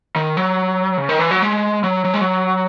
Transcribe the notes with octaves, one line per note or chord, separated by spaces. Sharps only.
D#3
F#3
C#3
D#3
E3
F#3
G#3
F#3
F#3
G#3
F#3